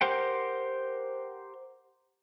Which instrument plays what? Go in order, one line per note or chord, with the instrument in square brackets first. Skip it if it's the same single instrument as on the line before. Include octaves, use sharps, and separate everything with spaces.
[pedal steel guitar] G4 A#4 C5 F#5 G5